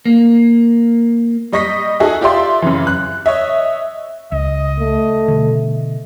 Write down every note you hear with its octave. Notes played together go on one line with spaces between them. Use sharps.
A#3
G3 D#5 C#6 A#6 B6
D#4 F#4 G#4 A4 D#5 E5
F4 G4 D5 E5 C6
F#2 C#3 E3
F#6
C#5 D#5 E5
C#2 D#5
A3
B2 D3